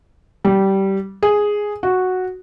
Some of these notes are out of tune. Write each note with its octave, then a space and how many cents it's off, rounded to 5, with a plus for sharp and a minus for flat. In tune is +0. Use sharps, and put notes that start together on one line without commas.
G3 -15
G#4 +0
F#4 -5